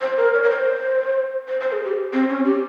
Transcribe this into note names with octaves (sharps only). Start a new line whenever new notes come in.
C5
A#4
C#5
A#4
C5
C5
C5
G#4
G4
C4
C#4
G4